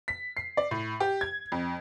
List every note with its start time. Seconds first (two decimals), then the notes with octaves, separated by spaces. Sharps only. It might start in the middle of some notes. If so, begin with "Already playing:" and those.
0.08 B6
0.37 C7
0.57 D5
0.71 A2
1.00 G4
1.21 G#6
1.52 F2